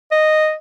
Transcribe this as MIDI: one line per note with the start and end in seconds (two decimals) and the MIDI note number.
0.12 0.54 75